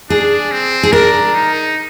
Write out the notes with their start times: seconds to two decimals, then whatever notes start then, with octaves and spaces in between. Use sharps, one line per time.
0.10 D4 G#4
0.51 C4
0.83 G#4
0.92 D4 A#4
1.34 D#4